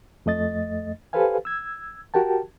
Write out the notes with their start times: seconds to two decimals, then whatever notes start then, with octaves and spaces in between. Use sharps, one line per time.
0.26 F2 A3 D#5 A6
1.13 G4 A4 B4 C5 F5 G#5
1.45 E6 G#6
2.14 F#4 G4 A#4 G5 A5